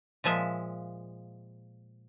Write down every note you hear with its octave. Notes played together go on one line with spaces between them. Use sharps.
A#2 F3 G#3 E5